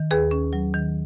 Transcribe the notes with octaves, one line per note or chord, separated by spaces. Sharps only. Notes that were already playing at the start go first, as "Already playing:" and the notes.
Already playing: D#3
D#2 G#4 B4
C#4
F#3
D#3